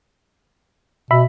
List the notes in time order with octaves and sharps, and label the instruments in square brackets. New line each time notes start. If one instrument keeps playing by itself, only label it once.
[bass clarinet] B2 [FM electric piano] E5 B5